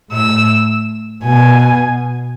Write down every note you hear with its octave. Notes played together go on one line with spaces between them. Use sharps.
A2 E6
B2 G#5